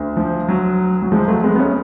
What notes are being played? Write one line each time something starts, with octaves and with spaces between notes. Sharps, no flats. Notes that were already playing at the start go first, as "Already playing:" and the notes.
Already playing: D2 D3
F3
F#3
F#3
F3 G#3
F#3 A3
G#3 B3
B3
A3 C#4